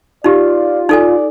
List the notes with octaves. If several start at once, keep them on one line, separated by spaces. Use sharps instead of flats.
D#4 F4 G4 D5
D#4 A4 D5 G#5